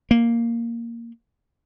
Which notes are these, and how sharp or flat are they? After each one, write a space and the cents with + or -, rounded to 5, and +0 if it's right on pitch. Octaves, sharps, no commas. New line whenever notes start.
A#3 -5